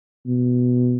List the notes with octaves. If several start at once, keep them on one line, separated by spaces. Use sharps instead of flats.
B2